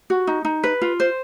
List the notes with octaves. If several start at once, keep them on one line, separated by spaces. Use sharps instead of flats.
F#4
D#4
D#4
B4
F4
C5